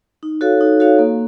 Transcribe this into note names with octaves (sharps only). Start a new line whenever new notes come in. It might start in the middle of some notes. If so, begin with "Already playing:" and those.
D#4
F#4 A4 C#5 F5
D#4
F#4 A4 C#5 F5
A#3